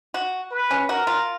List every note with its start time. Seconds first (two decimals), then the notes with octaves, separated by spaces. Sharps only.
0.14 F#4
0.52 B4
0.71 C#4
0.89 F#4 A#4
1.07 F4